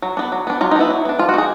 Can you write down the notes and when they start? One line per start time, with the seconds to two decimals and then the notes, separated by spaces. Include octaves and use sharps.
0.02 F#3
0.17 B3 D4
0.32 F#3
0.47 B3 D4
0.61 F#3 F4
0.71 D#4
0.76 B3 D4 E4
0.90 F#3
1.05 B3 D4
1.19 F3 F4
1.29 F#4
1.34 A#3 D#4 G#4